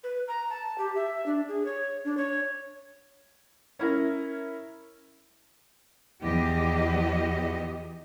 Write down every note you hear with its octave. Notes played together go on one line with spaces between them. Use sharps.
B4
A#5
A5
G4
E5
D4
G#4
C#5
D4
C#5
C#4 E4 A#4
E2 F3 G4 D#5